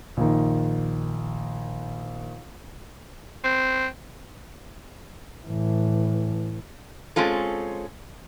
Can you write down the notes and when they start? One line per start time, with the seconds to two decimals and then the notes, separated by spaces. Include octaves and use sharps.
0.17 A#1 D#3
3.44 C4
5.46 A2 E3
7.16 G#3 C4 C#4 F4 A4